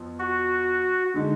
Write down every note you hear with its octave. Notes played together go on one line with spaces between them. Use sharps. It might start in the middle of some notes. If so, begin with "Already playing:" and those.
Already playing: F2 F3 B3
F#4
D3 G#3 D#4